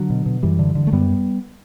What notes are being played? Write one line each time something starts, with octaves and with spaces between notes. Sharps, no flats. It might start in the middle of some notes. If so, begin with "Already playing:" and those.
Already playing: D3 F#3
B2
B2
F#2 E3 G3
D3
D3
A3
F#2 G3 B3